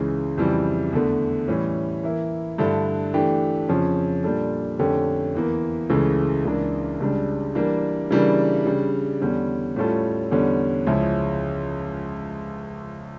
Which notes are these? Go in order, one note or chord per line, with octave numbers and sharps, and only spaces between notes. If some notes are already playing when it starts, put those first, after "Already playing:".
Already playing: C#2 C#3 E3
F2 C#3 E3 G3
E2 D3 A3
A2 E3 G3 C#4
E3 A#3 E4
G2 D3 A3 E4 A4
E3 A3 D4 G4
F2 C#3 F3 C#4
A#2 G3 D4 A4
F2 D3 A3 C#4 G4
E2 E3 A#3
C#2 C#3 E3 A3
C#2 C#3 E3 A#3 D4
C#2 C#3 G3 D4
E3 G3 A#3 D4
C#3 E3 G3 A#3 D4
C#3 G3 D4
E2 D3 G3 C#4
A2 G3 C#4 F4 A4
E2 D3 G3 C#4
C#2 C#3 F3 C#4 E4